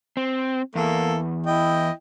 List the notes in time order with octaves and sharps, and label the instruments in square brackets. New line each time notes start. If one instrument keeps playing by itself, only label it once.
[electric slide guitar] C4
[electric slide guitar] E2 [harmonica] A#3 A4
[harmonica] E4 D#5 G5